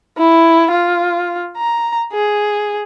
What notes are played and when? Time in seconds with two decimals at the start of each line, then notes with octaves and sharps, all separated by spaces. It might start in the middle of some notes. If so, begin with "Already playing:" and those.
0.17 E4
0.71 F4
1.57 A#5
2.12 G#4